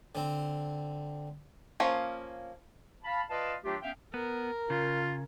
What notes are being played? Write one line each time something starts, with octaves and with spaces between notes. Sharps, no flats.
D3 C4
F3 A#3 C#4
F5 A5 B5
F4 B4 D5 D#5 F5 A5
D#3 F#3 A3 D4 F4 G4
B3 C#4 E5 F5 G5
B3 A#4
C#3 F4